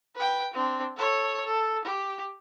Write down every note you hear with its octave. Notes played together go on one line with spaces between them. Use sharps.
B4 G5
C4 D4
A4 C#5
A4
G4